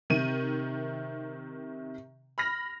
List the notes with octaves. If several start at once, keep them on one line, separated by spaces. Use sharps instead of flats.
C3 D#3 D#7
B5 F6 A#6